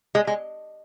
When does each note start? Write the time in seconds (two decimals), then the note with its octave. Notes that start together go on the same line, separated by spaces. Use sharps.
0.15 G#3
0.27 G#3